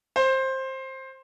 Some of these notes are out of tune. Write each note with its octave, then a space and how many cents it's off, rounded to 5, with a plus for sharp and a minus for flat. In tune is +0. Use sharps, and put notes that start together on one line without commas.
C5 +15